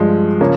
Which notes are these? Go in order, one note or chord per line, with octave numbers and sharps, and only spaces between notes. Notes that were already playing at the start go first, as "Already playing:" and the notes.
Already playing: G2 F3 G#3
C#3 F3 A#3 C#4